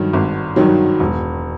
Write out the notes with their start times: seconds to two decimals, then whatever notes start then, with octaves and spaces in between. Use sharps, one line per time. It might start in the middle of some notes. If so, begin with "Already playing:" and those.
Already playing: G2 D#3 F#3
0.13 G#1
0.56 G2 D#3 F#3
1.00 E1